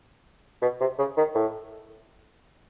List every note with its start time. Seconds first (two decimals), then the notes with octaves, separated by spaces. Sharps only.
0.62 B2
0.80 C3
0.98 C#3
1.17 D#3
1.35 A2